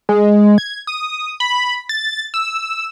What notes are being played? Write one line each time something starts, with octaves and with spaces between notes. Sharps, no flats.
G#3
G#6
D#6
B5
A6
E6